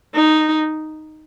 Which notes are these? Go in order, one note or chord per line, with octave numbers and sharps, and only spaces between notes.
D#4